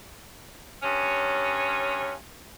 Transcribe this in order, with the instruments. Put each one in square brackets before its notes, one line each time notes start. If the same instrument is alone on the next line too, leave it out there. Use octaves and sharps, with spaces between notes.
[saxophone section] G2 C#4